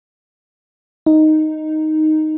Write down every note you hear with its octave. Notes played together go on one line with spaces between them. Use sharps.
D#4